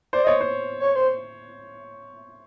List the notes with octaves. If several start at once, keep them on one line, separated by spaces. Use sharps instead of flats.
C5 D5
C#5 D#5
C5
C#5
C5